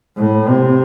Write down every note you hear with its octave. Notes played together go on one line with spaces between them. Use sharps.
A2
C3